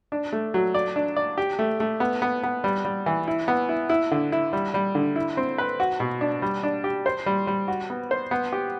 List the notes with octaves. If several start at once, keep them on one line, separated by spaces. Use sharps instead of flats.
D4
A3
F#3
D5
D4
D5
G4
A3
A3
B3
B3
B3
G3
G3
E3
E4
B3
E4
E4
D3
E4
G3
G3
D3
E4
C4
B4
F#4
B2
D4
G3
D4
G4
C5
G3
G3
F#4
B3
C5
B3
G4